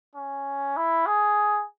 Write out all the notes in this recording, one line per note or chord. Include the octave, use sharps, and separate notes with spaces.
C#4
E4
G#4